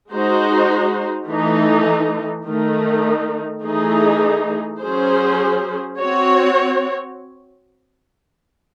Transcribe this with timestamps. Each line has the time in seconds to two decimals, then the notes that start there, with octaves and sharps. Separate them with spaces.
0.11 G#3 D#4 F#4 C5
1.29 E3 A3 D#4 A4
2.46 D#3 A3 D#4
3.63 E3 A3 D#4 G#4
4.80 F#3 C#4 G#4 C5
5.97 C4 F#4 C#5